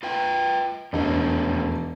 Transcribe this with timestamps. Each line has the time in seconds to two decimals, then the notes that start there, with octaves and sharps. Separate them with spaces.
0.03 F4 B4 G5
0.93 E1 F2 A3 C#4 D#4